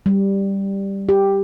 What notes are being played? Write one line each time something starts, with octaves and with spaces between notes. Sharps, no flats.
G3
G4